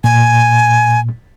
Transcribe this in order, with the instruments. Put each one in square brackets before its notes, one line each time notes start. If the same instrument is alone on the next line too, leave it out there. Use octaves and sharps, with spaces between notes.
[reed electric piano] A#2 [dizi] G#5